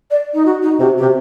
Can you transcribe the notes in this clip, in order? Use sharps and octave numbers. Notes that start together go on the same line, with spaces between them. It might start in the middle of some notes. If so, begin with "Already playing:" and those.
D5
D#4
F#4
D#4
C3 F#4
G4
C3